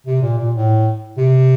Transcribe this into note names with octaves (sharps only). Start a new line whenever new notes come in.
C3
A#2
A#2
A2
C3